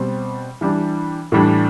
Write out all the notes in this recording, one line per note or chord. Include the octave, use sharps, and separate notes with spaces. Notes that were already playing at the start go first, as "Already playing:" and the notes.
Already playing: B2 G3 C4
E3 G3 D4
A2 E3 G3 D4